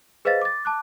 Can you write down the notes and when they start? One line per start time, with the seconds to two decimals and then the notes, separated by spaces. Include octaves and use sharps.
0.25 G#4 B4 C5 D#5 F5 A6
0.42 D6 A6
0.65 A5 D6 F#6